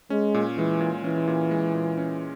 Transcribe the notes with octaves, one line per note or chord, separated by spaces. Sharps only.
G#3 C#4
A#2
E3 G#3
A#2
E3 C#4
A#2
G#3
A#2
C#4